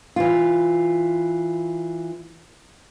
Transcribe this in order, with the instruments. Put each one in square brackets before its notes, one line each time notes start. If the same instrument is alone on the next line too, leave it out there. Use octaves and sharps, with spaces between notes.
[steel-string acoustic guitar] E3 F4